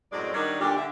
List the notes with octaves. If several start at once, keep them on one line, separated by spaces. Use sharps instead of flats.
F#2 A2 G#3 C4 D5
D#3 F#3 G3 D4 D#4 A#4
A#2 D3 G3 D4 G4
D3 E5